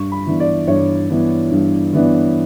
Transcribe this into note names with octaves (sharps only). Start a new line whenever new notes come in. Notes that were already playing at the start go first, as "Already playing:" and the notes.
Already playing: G2 C#6
B5
E3 B3 D4
D5
G2 C#5
E3 B3 D4
G2
E3 B3 D4